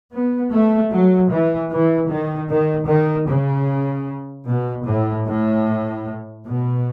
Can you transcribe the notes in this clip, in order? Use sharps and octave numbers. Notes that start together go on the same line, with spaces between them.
B3
A3
F#3
E3
E3
D#3
D#3
D#3
C#3
B2
A2
A2
B2